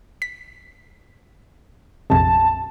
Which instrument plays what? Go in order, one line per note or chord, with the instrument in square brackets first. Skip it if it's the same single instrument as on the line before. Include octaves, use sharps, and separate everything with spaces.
[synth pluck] B6
[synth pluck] A#1 F2 C3 [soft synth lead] A5